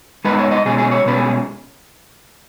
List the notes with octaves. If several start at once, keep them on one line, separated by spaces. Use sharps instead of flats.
G#2 G#3 B3 D#4 B4
C#5
D#5
B1 B2 G#3 C#4 G#4
G#4
C#5
B1 B2 G#3 C#4 B4
G#4